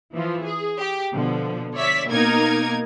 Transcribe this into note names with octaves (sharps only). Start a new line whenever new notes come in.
E3 F3
G#4
G4
B2 D3 F3
C#5 D5 E5 B6
B2 A#3 D#4 A#4 G#6